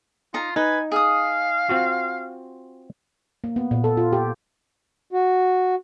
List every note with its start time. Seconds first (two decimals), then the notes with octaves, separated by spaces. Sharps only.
0.34 D#4 F4 A#5
0.56 D#4 B4 G#5
0.92 G#4 F5 D#6
1.69 C4 F4 F#4
3.44 A#3
3.56 B3
3.71 A#2
3.84 A4
3.97 F4
4.13 G4
5.11 F#4